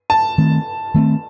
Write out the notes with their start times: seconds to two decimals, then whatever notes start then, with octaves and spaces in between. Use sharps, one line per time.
0.10 A5
0.38 D#3 A3 C4
0.94 D#3 A3 C4